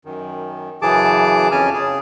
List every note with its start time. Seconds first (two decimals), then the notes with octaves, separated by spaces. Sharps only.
0.05 F#2 D#3
0.82 F#2 C#3 E3 G#4 A5 D6
1.52 F2 C#3 C#4 G#5 A5 F6
1.73 C#3 G#4